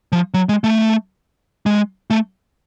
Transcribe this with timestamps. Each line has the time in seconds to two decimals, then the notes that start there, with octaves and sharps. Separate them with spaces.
0.12 F3
0.34 F#3
0.49 G#3
0.64 A3
1.66 G#3
2.10 A3